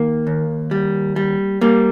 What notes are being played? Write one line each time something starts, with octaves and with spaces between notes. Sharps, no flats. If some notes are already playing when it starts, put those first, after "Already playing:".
Already playing: D#3 A#3
D#2
G3
G3
G3 A#3